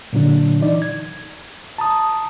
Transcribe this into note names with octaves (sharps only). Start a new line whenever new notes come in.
A#2 D3 F#3 D4
E3 D#4 D5
G#6
A5 A#5 D#6